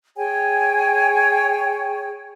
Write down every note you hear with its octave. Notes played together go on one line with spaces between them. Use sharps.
G#4 C#5 G5 G#5